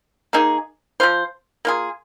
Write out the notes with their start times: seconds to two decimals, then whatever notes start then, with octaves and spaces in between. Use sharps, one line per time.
0.33 A#3 D#4 G#4
1.00 F3 A#3 F4 C5
1.65 A#3 F4 G#4